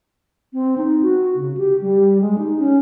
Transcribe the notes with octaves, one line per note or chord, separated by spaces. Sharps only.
C4
D#4
F#4
C#3
G4
G3
G#3
D#4
C#4